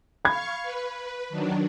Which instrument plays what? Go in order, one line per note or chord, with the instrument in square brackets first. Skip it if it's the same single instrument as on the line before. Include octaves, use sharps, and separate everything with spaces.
[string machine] F5 C#6 [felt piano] B5 G#6
[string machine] B4
D#3 F#3 D4